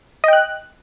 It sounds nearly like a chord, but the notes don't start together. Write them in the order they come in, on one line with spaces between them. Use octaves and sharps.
D#5 G5 F#6